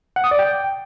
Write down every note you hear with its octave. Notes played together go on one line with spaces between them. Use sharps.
F#5
D#6
D5
G5